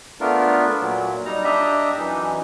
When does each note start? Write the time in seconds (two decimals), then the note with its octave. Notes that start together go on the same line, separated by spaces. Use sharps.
0.21 A3 B3 D4 F4 A#4
0.81 A#2 F#3
1.26 G3 D#4 A#5
1.44 D4 G4 D#5 E5 A#5
1.97 F#2 E3 D#4